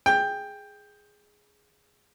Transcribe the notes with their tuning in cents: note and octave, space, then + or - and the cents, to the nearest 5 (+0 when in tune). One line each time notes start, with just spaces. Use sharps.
G#4 +0 G5 +10